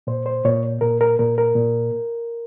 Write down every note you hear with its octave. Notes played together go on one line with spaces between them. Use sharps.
A#2 C5
C5
A#2 C#5
A#2 A#4
A#4
A#2 A#4
A#4
A#2